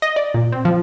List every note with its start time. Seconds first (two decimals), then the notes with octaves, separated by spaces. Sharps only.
0.02 D#5
0.16 D5
0.34 A#2
0.52 C4
0.65 F3